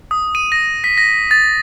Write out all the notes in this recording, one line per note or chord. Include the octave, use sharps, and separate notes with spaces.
D#6
D#7
A#6
B6
A#6
A6